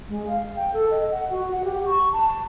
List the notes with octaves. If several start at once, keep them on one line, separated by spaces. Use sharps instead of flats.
G#3
F5
G5
A4
D#5
F#5
F#4
F#5
G4
C#6
A5